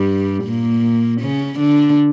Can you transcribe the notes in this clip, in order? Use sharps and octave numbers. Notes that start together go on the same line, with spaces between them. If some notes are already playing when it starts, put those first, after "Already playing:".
Already playing: G2 G3
A#2 A#3
C#3 C#4
D3 D4